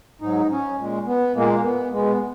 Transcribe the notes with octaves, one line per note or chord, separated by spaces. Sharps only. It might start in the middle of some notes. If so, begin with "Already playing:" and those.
G#2 F#3 D#4
C#4
A#2 G#3
B3
A#2 G#3 A#3
B3
B2 G#3 B3